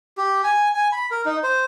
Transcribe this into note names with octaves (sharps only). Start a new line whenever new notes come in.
G4
G#5
G#5
B5
A#4
D#4
C5